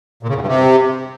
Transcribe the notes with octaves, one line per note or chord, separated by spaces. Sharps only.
A#2
C#3
E2
G2
C3